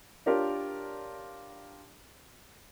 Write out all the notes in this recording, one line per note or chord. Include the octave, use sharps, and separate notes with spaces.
D4 F4 G4 A#4 C#5 D5